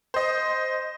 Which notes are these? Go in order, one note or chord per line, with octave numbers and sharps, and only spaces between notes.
C5 D#5